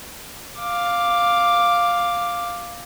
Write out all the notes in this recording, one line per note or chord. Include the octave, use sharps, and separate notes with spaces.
F5 D6